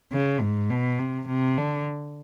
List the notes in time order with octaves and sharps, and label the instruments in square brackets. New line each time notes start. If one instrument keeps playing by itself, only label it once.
[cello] C#3
G#2
B2
C3
C3
D3